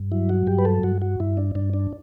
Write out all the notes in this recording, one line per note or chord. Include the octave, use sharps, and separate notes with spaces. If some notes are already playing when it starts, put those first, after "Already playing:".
Already playing: G2
F#3 E4
F#4
G2 G4
B4
A4
G2 F#4
F#4
G2 E4
D4
G2 D4
D4